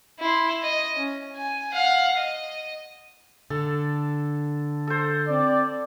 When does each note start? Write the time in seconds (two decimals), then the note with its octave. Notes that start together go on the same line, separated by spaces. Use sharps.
0.19 E4 C6
0.62 D#5
0.95 C#4
1.36 G#5
1.74 F5 F#5
2.17 D#5
3.50 D3 A4
4.87 A4 C5
5.28 C4 D5